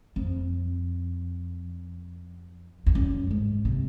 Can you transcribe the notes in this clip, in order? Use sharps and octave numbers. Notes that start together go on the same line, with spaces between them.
F2
F2
F#2
G#2
C3